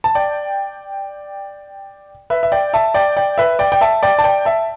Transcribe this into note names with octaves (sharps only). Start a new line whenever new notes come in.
A5
D5 G5
B4 E5
E5
D5 G5
E5 A5
D5 G5
D5 G5
B4 E5
D5 G5
G5
E5 A5
D5 G5
A5
D5 G5
E5 A5